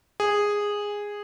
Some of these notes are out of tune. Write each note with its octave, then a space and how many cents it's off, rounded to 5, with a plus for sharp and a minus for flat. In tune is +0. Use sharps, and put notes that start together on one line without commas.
G#4 -10